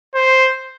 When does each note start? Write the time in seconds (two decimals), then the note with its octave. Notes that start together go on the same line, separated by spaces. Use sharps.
0.15 C5